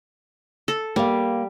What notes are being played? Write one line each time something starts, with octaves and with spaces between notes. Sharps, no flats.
A4
G3 A#3 F5